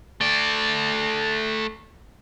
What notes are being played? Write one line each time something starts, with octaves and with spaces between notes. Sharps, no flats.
A3 D5